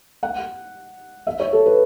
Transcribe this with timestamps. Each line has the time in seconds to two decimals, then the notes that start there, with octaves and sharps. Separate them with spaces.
0.23 F#5
1.27 E5
1.40 C#5
1.52 A4
1.66 B4